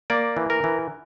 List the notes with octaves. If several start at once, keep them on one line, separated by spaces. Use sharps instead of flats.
A#3 D5
E3
A#4
E3